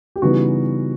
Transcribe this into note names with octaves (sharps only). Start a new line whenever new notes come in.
G4
C#3 E3 G3 B3 D#4 F#4